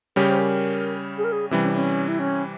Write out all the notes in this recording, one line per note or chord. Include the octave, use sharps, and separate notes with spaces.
C#3 G3 C#4 G4 A#4
C5
A#4
G#4
A#4
G#4
C3 E3 G3 C#4
C#4
C#4
E4
C#4